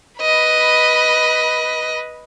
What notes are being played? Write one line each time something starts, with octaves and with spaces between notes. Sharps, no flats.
B4 D#5 B5